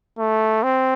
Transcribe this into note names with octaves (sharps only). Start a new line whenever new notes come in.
A3
C4